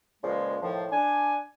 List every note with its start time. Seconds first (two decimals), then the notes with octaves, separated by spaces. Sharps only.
0.22 C#2 A#2 C#3 F3 G#3
0.62 A2 D#3 F3
0.92 D4 G#5